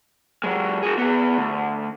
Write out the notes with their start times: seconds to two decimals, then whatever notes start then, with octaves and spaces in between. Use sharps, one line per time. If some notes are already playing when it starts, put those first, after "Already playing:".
0.44 F#3 G#3
0.83 F#4 G#4
0.98 B3 G#4
1.38 D2